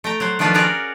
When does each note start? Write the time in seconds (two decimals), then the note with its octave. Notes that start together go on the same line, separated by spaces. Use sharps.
0.04 A3 G5 A#5
0.20 F#3 C5
0.39 D#3 F3 A3 D4 F4 B4
0.54 C#4 F#4 G#4 A#4 D5 A#5